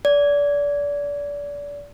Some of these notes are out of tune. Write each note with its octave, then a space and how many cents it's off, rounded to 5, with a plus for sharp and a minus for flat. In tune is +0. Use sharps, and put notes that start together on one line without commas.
D5 -30